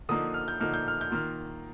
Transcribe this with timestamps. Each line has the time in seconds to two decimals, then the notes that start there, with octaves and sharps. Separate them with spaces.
0.09 D3 F3 A#3 D#4 D#6
0.34 F6
0.48 G6
0.60 D3 F3 A#3 D#4 F6
0.74 G6
0.88 F6
1.01 G6
1.11 D#3 A#3 F4 F6